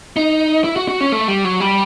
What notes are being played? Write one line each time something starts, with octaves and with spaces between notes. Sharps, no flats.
D#4
E4
F#4
F#4
C#4
A3
G3
F#3
G3